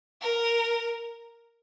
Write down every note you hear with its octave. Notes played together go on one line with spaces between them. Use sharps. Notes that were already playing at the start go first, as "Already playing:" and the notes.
A#4